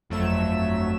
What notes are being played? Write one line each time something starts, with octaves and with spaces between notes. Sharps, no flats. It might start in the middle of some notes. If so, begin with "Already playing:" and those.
G1 F2 F#3 A3 E5 E7